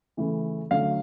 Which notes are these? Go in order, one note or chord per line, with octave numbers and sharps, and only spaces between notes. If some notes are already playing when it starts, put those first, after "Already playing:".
C#3 E3 A3
D3 F#3 A3 F5